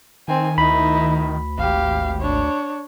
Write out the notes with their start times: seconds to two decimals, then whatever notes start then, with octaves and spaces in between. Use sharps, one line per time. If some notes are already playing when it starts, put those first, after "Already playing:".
0.28 D#3 C4 G#5
0.58 D2 D#4 E4 B5
1.58 G#1 G4 F5
2.21 D4 C#5